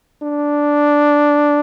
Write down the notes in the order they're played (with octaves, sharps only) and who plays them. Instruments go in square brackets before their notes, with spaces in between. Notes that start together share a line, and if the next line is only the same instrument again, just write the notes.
[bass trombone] D4